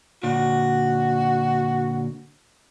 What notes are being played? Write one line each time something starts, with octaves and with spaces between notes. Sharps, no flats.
A#2 D3 F#4